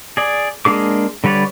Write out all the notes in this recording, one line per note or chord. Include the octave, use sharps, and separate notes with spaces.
G#4 D5
G#3 A#3 D4 G#4 D6
D3 G3 B4 C#5 D5